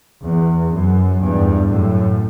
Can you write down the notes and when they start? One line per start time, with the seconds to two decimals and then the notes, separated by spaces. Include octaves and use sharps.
0.22 E2
0.72 F#2
1.20 E2 G2
1.69 F#2 A2